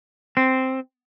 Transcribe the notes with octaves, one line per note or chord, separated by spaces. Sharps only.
C4